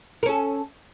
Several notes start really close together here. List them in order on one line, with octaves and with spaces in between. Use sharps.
A#4 C#4 A4